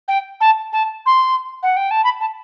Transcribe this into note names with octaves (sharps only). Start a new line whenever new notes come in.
G5
A5
A5
C6
F#5
G5
A5
B5
A5